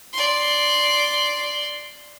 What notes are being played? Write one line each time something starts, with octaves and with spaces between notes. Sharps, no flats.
D5 C6